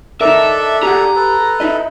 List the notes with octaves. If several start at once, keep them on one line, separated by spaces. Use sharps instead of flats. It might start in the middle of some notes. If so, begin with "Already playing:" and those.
D4 D#4 A4 A#4 E5
G4 G#4 F#5 A#5
A4 B4
D#4 E4 D#5